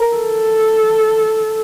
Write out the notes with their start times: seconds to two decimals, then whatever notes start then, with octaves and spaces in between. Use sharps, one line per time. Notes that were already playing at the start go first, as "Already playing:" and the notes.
Already playing: A#4 A#5
0.15 A4